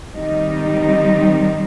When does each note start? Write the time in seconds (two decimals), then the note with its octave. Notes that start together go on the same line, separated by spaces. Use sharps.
0.14 D#3 G3 C4 D#4